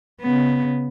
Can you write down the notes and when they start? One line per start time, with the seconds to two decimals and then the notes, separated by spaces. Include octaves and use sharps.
0.21 C#3 B3